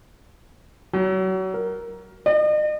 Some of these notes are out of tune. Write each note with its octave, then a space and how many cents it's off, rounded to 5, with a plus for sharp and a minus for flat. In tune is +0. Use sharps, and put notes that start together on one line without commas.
F#3 +30
A#4 +5
D#5 -45